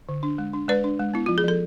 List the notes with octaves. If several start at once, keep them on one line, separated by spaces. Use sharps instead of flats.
D3
D4
G#3
D4
G#3 B4 D5
D4
G#3
B3 E4
F3 F4
G#4
F3 A4